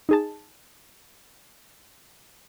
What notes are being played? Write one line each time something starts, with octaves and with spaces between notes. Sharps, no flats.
D#4 G#4 A5